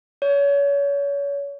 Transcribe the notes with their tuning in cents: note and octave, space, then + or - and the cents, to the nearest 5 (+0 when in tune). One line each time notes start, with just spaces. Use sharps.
C#5 +30